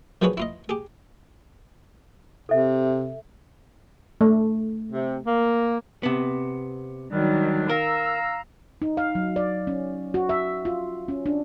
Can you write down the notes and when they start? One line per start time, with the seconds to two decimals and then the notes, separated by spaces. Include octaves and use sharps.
0.22 D#3 F3 F#3 G#4 B4 C#5
0.37 E4 F4 D#5
0.69 G4 G#4
2.49 C3 A4 E5
4.21 A3
4.91 C3
5.25 A#3
6.03 C3 B3
7.11 D#3 F#3 G3 D4
7.69 A#4 F5 A#5 E6
8.82 D#4
8.97 F5
9.15 F#3
9.36 D5
9.67 C#4
10.14 F#4
10.29 E5
10.65 F4
11.08 C#4
11.26 D4